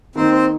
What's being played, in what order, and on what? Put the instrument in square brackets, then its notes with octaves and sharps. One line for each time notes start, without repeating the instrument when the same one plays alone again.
[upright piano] D#3 A#3 D#4 [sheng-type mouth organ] C4 C5
[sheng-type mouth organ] C5